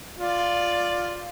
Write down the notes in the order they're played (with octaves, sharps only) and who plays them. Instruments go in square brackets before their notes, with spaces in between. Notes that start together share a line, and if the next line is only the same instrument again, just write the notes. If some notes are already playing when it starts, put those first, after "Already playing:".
[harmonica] F4 D5